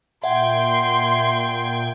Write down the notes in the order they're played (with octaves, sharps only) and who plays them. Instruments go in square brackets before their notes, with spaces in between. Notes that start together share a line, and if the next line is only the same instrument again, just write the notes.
[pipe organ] A#2 G5 G#6 [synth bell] E5 F#5 [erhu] C6